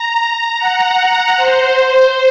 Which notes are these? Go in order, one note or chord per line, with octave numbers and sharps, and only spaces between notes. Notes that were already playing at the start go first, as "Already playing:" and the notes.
Already playing: A#5
F#5
F#5
C5